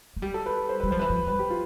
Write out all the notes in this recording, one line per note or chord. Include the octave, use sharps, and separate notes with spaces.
A3
G3 G4
A4
B4
C5
G3 B4
F3 C5
E3 B4
F3
G3 B4
G4
F4